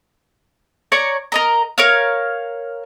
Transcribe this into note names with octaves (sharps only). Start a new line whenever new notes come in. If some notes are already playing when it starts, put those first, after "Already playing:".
C#5 D5 A#5 C#6
A#4 D#5 A#5
A#4 C#5 F5